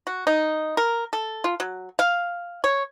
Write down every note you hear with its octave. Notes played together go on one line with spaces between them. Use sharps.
F#4
D#4
A#4
A4
F4
F#3
F5
C#5